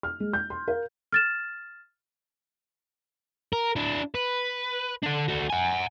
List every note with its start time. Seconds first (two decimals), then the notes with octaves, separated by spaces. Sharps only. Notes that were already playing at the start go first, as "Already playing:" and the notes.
0.03 F6
0.20 G#3
0.33 G6
0.50 C6
0.68 A#4 F5
1.12 F6 A6 E7
3.53 A#4
3.76 D4 E4
4.14 B4
5.03 D3 D4
5.28 A3 F#4
5.50 F#5 G#5